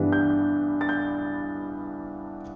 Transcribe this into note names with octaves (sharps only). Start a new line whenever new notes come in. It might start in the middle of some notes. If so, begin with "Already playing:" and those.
Already playing: G2 E3 G3 B3 D4
G6
A6
G6